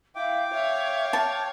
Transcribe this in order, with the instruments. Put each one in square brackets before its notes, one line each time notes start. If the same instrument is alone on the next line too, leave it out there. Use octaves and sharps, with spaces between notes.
[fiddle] E4 [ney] F5 [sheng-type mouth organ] G5 D6
[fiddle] C#5 F5 [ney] E5
[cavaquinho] A5